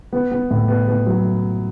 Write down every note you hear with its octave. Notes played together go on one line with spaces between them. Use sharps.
B3
B3
A2
B3
B3
F#3